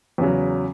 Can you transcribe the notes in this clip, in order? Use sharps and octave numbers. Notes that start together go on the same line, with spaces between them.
E2 C#3 F#3